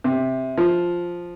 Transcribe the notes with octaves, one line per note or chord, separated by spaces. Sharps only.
C3
F3